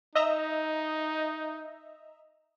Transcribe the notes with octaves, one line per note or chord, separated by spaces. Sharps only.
D#4 D#5 E5 A#5